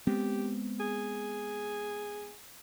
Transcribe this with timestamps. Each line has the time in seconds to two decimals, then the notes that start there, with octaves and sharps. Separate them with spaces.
0.07 G#3 B3 C4 G4
0.80 G#4